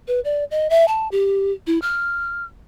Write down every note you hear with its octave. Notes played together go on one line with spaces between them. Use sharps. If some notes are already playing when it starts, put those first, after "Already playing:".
B4
D5
D#5
E5
A5
G4
E4
F6